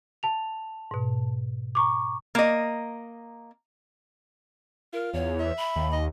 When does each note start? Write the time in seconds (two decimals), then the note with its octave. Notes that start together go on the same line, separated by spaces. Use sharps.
0.23 A5 F7
0.91 G#2 B2
1.75 A#5 C#6 D6
2.35 A#3 D#5
4.93 F4 A#4
5.14 E2 C#5
5.40 E5
5.57 B5
5.76 D#2
5.93 D#5